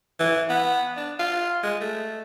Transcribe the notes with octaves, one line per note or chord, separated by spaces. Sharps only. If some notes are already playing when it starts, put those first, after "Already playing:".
E3
B3
D4
F4
G#3
A3